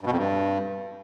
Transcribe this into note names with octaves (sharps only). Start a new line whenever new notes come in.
G2
B2
F2
G2